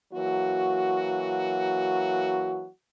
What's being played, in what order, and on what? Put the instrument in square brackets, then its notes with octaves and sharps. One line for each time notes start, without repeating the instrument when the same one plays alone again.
[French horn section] E3 F#3 A#3 F#4